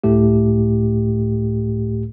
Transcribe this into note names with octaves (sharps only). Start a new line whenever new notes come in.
C#2 A2 A3 G4